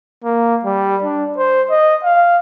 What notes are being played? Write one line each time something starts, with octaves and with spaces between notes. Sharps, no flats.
A#3
G3
D4
C5
D#5
F5